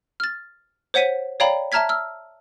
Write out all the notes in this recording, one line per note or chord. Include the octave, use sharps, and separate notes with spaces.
F6 A6
C5 C#5 F#5 B6 D#7
C#5 D5 F5 G5 A#5 B5
E5 A5 A#5 F6 G#6 B6
E6 F6